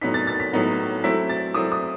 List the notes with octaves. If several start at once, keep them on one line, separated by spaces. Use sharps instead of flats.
A2 F#3 B3 D#4 B6
A6
A6
B6
A2 F#3 B3 D#4
F#3 A3 C4 E4 B6
A6
F#3 A3 C4 E4 D#6
D#6